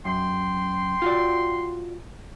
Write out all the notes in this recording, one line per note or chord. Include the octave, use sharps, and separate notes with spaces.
F#2 G5 C6
F4 F#4 D5